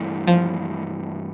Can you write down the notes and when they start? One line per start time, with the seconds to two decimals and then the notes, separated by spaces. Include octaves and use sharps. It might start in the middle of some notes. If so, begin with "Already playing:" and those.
Already playing: G2 E3 A3 E4
0.27 F3